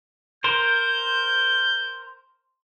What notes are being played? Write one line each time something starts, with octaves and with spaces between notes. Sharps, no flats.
A#4 C5 G6